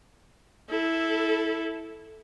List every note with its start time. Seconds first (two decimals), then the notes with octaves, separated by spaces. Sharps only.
0.69 E4 A4